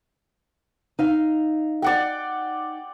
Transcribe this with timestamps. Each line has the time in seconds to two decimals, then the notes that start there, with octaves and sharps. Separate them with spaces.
0.99 D#4 F5
1.82 D5 F#5 G5